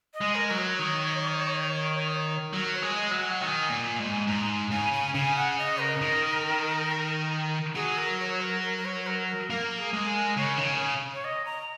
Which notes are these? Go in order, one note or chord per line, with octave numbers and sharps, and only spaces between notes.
D#5
G#3
A#4
F#3 A#4
C#5
D#3
F#3 A#4
C#5
G#3
D#5
F#3
G#5
F#5
D#3 G#5
A#2
G#2
G#2 A#5
C#3 G#5
G#5
C#3 G#5
F#5
D#5
A#4
D#3
F#3 G#4
A#4
C#5
A#4
A#4
A#4
C#5
A#4
A#4
A#3 A#4
G#4
G#3
A#4
C#3 C#5
D#3
C#3
C#5
D#5
A#5